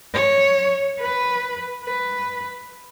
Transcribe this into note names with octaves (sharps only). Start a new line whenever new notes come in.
C#5
B4
B4